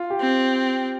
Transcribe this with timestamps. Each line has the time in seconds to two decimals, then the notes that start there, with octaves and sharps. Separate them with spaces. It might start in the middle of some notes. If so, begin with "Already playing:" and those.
Already playing: F4
0.10 G4
0.21 C4